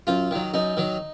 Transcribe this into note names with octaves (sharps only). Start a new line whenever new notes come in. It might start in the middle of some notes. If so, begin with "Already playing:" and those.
F#2 F4
D#3 F#3
F#2 D#4
D#3 F#3